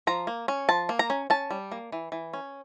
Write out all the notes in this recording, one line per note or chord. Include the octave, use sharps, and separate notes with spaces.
F3 A#5
A#3
C#4
F3 A5
A#3
A#5
C#4
C#4 A5
G3
A#3
E3
E3
C#4